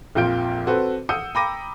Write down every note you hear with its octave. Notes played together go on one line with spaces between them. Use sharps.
A#1 F2 A#2 F4 G6 D7
C4 F#4 A4 B4 C5
F#5 D#6 E6 G6 C#7 D#7
G5 A#5 B5 D6 A#6 D#7